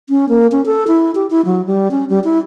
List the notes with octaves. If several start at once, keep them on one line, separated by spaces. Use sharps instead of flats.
C#4
A#3
C#4
A4
E4
G4
E4
F#3
G3
C#4
G3
E4